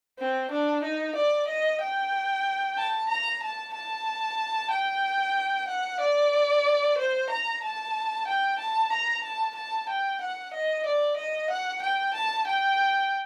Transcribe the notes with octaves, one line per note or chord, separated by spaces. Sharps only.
C4
D4
D#4
D5
D#5
G5
A5
A#5
A5
A5
G5
F#5
D5
C5
A#5
A5
G5
A5
A#5
A5
A5
G5
F#5
D#5
D5
D#5
F#5
G5
A5
G5